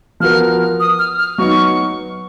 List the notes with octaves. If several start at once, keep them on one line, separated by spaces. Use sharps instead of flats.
F3 B3 F#4 A#4 F6
D#6
F6
F6
F#3 B3 D#4 C#6